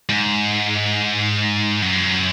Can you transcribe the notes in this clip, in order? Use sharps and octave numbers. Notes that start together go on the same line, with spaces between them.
G#2
F#2